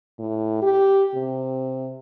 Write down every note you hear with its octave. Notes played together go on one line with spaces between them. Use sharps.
A2
G4
C3